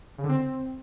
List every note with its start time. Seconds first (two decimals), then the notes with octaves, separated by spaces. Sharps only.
0.18 C#3
0.24 D3
0.29 C4